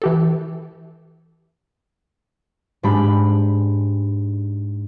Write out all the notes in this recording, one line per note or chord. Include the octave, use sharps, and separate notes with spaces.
E3 G4 A4
G#2 G#3 D4 G4 B5